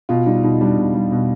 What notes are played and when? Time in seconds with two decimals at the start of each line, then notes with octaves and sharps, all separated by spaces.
0.09 B2 F4
0.26 G3 D#4
0.44 B2 D#4
0.61 G3 D4
0.78 B2
0.94 G3
1.12 B2